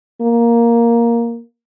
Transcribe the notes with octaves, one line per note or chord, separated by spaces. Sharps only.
A#3